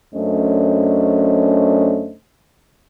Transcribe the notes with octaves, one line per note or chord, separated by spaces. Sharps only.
F#2 A3 C#4 D4 C5 D#5